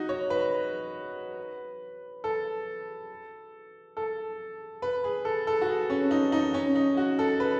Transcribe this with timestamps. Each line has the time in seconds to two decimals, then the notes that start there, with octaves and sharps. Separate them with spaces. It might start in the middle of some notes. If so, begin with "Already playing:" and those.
Already playing: D#4 F#4
0.09 C#5
0.30 B4
2.24 A4
3.97 A4
4.82 B4
5.04 G#4
5.25 A4
5.47 A4
5.61 F#4
5.68 G#4
5.90 C#4
6.11 D#4
6.32 D#4
6.54 C#4
6.75 D#4
6.97 F#4
7.19 A4
7.40 B4